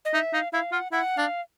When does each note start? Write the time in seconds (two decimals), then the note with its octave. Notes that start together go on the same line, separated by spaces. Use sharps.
0.05 D#5
0.13 D#4 E5
0.33 D#4 F5
0.52 E4 F5
0.72 F4 F#5
0.92 E4 F#5
1.17 D4 F5